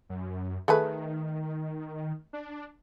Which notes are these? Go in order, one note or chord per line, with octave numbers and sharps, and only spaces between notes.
F#2
D#3 A3 G#4 B4
D4